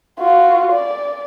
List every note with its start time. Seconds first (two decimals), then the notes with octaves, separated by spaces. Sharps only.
0.20 F4 F#4
0.73 D5